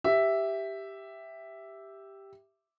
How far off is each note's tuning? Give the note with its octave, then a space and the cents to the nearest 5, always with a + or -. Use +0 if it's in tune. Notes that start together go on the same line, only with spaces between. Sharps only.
G4 +0 E5 +0